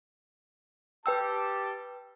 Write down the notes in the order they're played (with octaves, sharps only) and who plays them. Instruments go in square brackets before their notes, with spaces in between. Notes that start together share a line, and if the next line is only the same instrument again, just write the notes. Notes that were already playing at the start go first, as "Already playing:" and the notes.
[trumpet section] G4 A5 [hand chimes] B4 G5 E6